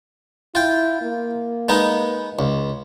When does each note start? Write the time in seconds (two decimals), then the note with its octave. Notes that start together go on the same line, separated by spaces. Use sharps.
0.55 E4 F4 G5
1.02 A#3
1.69 G#3 B3 D#4
2.39 C#2